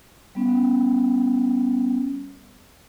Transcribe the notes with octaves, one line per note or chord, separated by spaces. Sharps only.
G3 B3 C#4